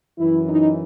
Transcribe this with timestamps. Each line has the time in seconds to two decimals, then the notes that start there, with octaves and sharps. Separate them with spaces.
0.19 F#2 E3 E4
0.49 D#4